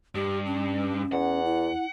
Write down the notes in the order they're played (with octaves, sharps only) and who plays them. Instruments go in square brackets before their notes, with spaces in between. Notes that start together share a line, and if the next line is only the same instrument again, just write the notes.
[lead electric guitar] G2 [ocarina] G4
[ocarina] C#4
[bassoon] E2 [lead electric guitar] F#5
[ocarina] E4